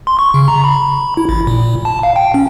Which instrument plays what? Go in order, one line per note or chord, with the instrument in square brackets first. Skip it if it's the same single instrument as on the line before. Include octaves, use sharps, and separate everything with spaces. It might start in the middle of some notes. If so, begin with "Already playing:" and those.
[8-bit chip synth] C6
C#6
C#3
A#5
B5
E4
A1
A#2
A5
F5
G5
C#4